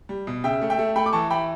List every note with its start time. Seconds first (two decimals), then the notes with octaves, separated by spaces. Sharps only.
0.09 G3
0.27 B2
0.44 C#3 E5 G5
0.61 A3
0.70 E5 G5
0.78 A3
0.96 A3 G5 B5
1.06 D6
1.13 E3 A5 C#6
1.30 E3 G5 B5